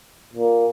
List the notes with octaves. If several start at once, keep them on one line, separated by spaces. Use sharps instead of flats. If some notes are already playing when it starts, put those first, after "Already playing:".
A#2